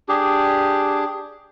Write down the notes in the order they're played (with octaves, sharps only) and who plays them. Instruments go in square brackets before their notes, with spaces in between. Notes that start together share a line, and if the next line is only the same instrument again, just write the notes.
[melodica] D4 G4 G#4